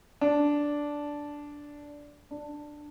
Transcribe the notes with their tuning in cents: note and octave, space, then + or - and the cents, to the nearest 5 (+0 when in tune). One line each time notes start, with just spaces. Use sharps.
D4 -5
D4 +10